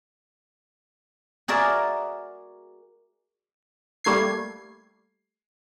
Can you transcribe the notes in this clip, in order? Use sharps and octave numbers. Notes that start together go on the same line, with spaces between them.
F#4 G#4 A#4 D5 E5
G3 A3 A#3 G#6 C7